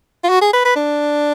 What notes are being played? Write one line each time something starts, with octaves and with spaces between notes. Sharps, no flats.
F4
F#4
G#4
B4
B4
D4